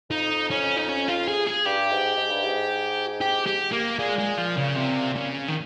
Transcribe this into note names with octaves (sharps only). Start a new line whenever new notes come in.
F2 D#4
C#4
D#4
C#4
F4
G#4
G#4
G2 G4
G#2
G#2
G2
G#2
G4
G4
A#3
A#2 G#3
G#3
F3
C#3
C3
C#3
D#3